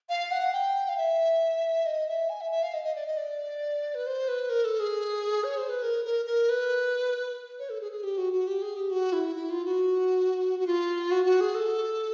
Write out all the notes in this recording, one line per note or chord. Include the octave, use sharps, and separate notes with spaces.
F5
F#5
G5
F5
E5
D#5
E5
G#5
E5
E5
F5
D#5
D#5
D5
D#5
D5
B4
C5
B4
A#4
A4
G#4
C#5
C5
B4
A#4
A#4
A#4
B4
C#5
A4
G#4
G#4
G4
F#4
F#4
G4
G#4
G4
F#4
E4
E4
F4
F#4
F#4
F4
F#4
F#4
G#4
A4